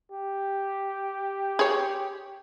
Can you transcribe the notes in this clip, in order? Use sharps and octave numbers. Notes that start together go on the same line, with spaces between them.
G4
G#4 C#5